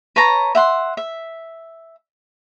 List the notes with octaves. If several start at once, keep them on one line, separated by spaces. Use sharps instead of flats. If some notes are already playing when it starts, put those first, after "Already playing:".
B4 C#5 A5 A#5
E5 F#5 C6
E5